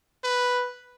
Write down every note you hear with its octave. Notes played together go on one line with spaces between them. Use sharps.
B4